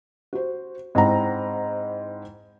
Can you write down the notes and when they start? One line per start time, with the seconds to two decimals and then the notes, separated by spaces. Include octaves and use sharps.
0.33 F#4 C5
0.95 G#2 C4 E4 F#5 A#5 B5